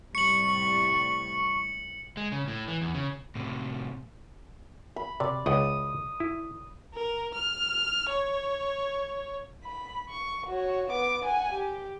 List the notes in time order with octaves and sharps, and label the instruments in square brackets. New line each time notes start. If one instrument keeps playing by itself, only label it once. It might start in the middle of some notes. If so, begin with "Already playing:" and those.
[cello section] A2 C3 G3 [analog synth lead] C#6 [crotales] C#7 F#7
[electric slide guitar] G#3
C#3
A2
E3
E2
C#3
[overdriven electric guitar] A2 C3
[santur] B5
[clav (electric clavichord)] C3 [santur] D5
[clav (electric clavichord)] C#2 F#5 G5 [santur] D#6
[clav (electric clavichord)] E4
[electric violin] A#4
F6
C#5
[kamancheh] B5
C#6
F#4 C#5
B3 D6
F#5 G#5
G4